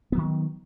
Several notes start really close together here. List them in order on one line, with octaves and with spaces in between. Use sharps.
B3 F#3 D#3